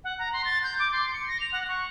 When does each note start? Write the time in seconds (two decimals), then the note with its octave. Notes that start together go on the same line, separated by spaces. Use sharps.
0.04 F#5
0.19 A#5
0.33 C6
0.45 A6
0.63 G6
0.79 D6
0.92 C6
1.13 C#7
1.28 A#6
1.40 F7
1.52 F#5
1.68 C#6